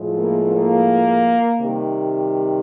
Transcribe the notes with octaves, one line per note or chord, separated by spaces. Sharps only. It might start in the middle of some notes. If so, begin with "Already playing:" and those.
Already playing: A2 F3 G#3
A#3
A#3
C3 D#3 G3